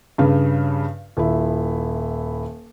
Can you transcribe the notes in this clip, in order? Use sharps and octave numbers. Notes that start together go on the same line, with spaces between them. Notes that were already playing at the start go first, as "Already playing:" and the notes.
G2 C#3
D#1 E4